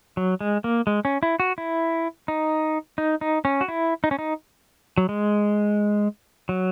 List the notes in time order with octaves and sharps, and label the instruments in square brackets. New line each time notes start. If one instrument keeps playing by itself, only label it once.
[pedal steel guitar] F#3
G#3
A#3
G#3
C#4
E4
F#4
E4
D#4
D#4
D#4
C#4
F#4
E4
D#4
C#4
D#4
F#3
G#3
F#3